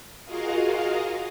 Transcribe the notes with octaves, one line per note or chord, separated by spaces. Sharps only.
F4 F#4 G#4 A#4 D#5 F5